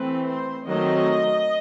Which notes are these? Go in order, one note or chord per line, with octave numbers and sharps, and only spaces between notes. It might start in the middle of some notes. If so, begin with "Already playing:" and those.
Already playing: E3 A3 C4 B4
C5
D#3 F#3 A3 C4 D#5